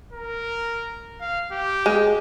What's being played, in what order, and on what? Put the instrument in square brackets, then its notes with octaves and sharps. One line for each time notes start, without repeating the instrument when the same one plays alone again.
[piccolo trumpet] A#4
F5
G4
[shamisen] G#3